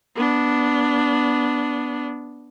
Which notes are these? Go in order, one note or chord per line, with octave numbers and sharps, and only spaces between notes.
B3 D4